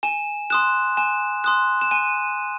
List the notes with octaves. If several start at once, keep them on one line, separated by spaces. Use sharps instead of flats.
G#5 E7
C6 D#6 F#6 E7
G#5 E7
C6 D#6 F#6
E7
G#5 D#7